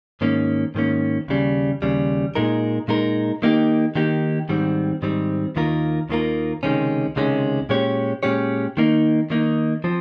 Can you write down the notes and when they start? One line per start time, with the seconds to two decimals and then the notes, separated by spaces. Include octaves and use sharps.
0.21 G#2 D#3 A#3 C#4
0.75 G#2 D#3 A#3 C#4
1.28 D#2 C#3 G3
1.82 D#2 C#3 G3
2.35 A#2 G#3 D#4 A#4
2.88 A#2 G#3 D#4 A#4
3.42 D#3 A#3 D#4 G4
3.95 D#3 A#3 D#4 G4
4.49 G#2 D#3 G3 C4
5.02 G#2 D#3 G3 C4
5.56 D#2 D#3 A#3 F4 A#4
6.09 D#2 D#3 A#3 F4 A#4
6.63 C#2 C3 D#3 G#3 C#4
7.16 C#2 C3 D#3 G#3 C#4
7.69 A#2 G#3 C#4 G4 C#5
8.23 A#2 G#3 C#4 G4 C#5
8.77 D#3 A#3 D#4
9.30 D#3 A#3 D#4
9.84 F3 C4